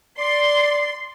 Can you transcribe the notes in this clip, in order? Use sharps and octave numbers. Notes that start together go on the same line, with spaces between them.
D5 C6